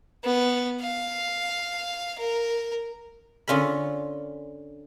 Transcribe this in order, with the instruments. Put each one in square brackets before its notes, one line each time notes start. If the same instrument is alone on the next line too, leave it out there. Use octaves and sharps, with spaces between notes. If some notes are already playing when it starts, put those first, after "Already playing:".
[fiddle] B3
F5
A#4
[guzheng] D3 C#4 F4 A#4 B5